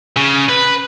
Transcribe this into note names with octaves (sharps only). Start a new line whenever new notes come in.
C#3
B4